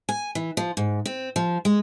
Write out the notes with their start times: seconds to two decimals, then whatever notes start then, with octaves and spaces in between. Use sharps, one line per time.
0.09 G#5
0.35 E3
0.57 F3
0.77 G#2
1.06 C4
1.36 F3
1.65 G#3